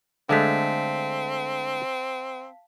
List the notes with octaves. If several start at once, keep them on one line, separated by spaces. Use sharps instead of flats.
D3 G#3 A3 C4 F5 A5 B6